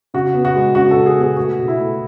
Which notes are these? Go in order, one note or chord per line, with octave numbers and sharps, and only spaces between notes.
C#3 F#4
B3
F#4
G#3
C#3 F#4
A4
C#3
G#4
B3
G#4
A3 F#4
B2
E4
A3